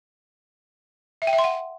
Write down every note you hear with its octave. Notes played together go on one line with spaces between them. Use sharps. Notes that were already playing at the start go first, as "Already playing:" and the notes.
E5
G5
E5
C6
F#5